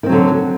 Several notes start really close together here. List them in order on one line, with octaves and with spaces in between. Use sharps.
D#3 C4 F#3 D3